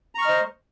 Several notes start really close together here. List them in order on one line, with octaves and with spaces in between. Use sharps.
A#5 C#6 F6 D#5 C5